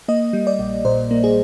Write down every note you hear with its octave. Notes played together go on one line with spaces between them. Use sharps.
A#3 D#5
G3
D5
A#1
A#2 C5
A#3
G#4